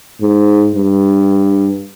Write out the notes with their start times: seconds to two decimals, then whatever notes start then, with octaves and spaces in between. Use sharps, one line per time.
0.22 G#2
0.76 G2